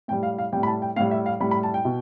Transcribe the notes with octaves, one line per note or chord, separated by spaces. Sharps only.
A2 G3 G5
F5
F5
A2 G3 G5
B5
A5
G5
A2 G3 F5
E5
F5
A2 G3 B5
B5
A5
G5
B2